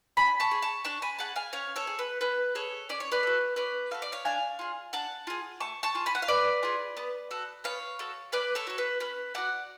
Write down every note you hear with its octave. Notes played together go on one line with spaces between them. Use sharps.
D4 G#5 B5
A5 C#6
G#4
A5 C#6
D4 A5 C#6
G#5 B5
G#4 F#5 A5
F5 G#5
C#4 C#5 F5
A4 C#5
G#4
B4
C#4 B4
G#4 A4 C#5
C#4 D5
C#5
B4 D5
F#4 A4
C#4 B4 D5
F#4 A4 F5
D5
C#5 F5
D4 F5 G#5
F4 G#4
D4 F#5 A5
F4 G#4
A3 A5 C#6
A5 C#6
F4 G#4
G#5 B5
F#5
F5
A3 B4 D5
F4 G#4
B3
F#4 A4
B3 C#5 F5
F#4 A4
C#4 B4 D5
A4 C#5
F#4 A4
B4
C#4 B4
F#4 A4 D5 F#5